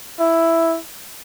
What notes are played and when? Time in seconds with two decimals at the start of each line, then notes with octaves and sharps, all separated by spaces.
0.20 E4